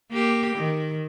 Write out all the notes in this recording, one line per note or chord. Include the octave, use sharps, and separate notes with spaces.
A#3 G4
D#3